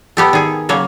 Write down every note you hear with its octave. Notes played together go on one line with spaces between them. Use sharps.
B3 G4 A4
D#3 G#4
C#3 F#3 A#3 C#5